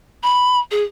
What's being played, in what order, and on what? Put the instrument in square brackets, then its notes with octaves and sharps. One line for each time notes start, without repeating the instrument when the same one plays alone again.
[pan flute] B5
G#4